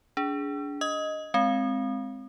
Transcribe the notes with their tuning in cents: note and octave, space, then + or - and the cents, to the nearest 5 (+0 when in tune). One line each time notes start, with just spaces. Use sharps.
D4 -30 G#4 +0
D#5 +0 D#6 +25
G#3 +0 C4 +0 F5 +0